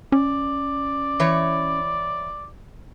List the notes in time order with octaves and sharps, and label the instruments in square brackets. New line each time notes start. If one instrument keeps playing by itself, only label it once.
[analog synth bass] C#4 [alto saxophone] D5
[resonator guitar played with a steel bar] E3 C#5